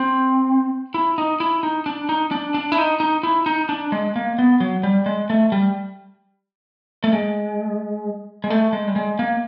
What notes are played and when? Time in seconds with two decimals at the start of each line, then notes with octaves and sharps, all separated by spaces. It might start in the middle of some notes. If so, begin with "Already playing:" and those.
Already playing: C4
0.94 E4
1.18 D#4
1.40 E4
1.63 D#4
1.86 D4
2.09 D#4
2.31 D4
2.54 D4
2.72 E4
2.78 D#4
3.00 D#4
3.23 E4
3.46 D#4
3.69 D4
3.92 G#3
4.16 A#3
4.39 B3
4.60 F#3
4.83 G3
5.06 G#3
5.30 A3
5.52 G3
7.04 A3
7.13 G#3
8.44 G#3
8.50 A3
8.73 G#3
8.87 G3
8.96 G#3
9.19 A#3